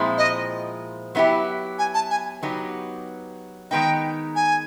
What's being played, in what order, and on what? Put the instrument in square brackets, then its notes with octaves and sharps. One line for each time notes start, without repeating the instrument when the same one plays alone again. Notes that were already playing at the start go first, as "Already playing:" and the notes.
Already playing: [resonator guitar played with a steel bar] A#2 F3 G#3 C4 E4
[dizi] D#5
[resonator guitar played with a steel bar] F#3 B3 E4 G4
[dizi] G#5
A5
G#5
[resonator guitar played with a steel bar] F#3 B3 D#4 G4
[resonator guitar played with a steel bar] D#3 G#3 B3 D#4 [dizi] G5
[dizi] G#5